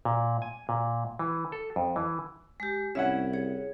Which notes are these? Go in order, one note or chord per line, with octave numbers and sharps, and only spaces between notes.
A#2
G#5
A#2
E3
A4
F2
E3
G#3 G4
C2 C#4 E4 E5 F#5
G#4 C#5